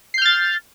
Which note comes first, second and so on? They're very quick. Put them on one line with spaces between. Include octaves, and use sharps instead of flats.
C7 G6 F6 A6